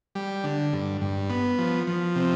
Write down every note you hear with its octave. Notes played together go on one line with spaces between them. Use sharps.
G3
D3
G2
G2
B3
F3
F3
C3